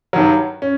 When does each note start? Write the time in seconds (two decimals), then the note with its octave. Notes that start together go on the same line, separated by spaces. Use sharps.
0.13 G2 D#3 F#3
0.62 C#4